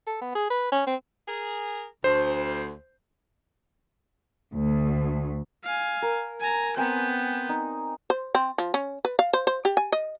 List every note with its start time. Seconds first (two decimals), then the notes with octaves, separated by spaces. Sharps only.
0.07 A4
0.22 B3
0.35 G#4
0.50 B4
0.72 C#4
0.87 C4
1.28 G#4 A#4
2.04 D2 C5
4.54 D2
5.64 F5 G#5
6.02 A#4
6.41 G#5 A#5
6.77 B3 C4 G#5 A#5 G6
7.49 D#4
8.10 C5
8.35 C4
8.58 F3
8.74 C#4
9.05 B4
9.19 F5
9.33 C5
9.47 C5
9.65 G4
9.77 G#5
9.92 D#5